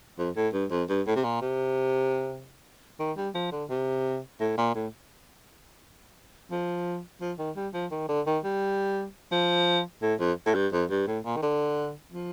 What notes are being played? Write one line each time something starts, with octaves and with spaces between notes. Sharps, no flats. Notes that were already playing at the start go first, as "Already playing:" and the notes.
F2
A2
G2
F2
G2
A2
C3
A#2
C3
D#3
G3
F3
D3
C3
A2
A#2
A2
F3
F3
D#3
G3
F3
D#3
D3
D#3
G3
F3
A2
F2
A2
G2
F2
G2
A2
A#2
D#3
D3
F3